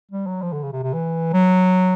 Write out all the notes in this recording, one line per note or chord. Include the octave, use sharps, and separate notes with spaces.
G3
F#3
F3
D3
C#3
C3
C3
E3
F#3